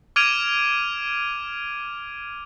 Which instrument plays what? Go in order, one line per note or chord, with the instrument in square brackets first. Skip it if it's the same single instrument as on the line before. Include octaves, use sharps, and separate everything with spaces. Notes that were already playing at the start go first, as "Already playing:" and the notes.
[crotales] D6 F6 G#6 D7 D#7 F7